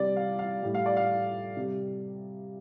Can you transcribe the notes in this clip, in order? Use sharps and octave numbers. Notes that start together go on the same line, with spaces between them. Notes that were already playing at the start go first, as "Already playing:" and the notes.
Already playing: C3 G3 D5
F5
F5
A2 G3
F5
D5
F5
C3 G3